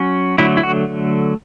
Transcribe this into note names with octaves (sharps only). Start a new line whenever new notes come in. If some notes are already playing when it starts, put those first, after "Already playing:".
Already playing: F#3 C#4
D3 F#3 A3 E4
E4
F#4